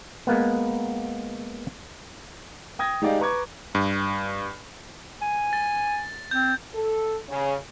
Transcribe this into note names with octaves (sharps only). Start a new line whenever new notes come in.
G#3 A#3 B3
G5 D#6 G#6 A#6
G#3 D#4 G4 D5 D#5 F5
B4 A#5 C#6 D6 G#6
G2
G#5
A6
C4 G6
A4
C#3